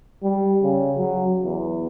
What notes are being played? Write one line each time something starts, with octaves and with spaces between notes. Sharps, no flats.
G3
C#3
F#3
E2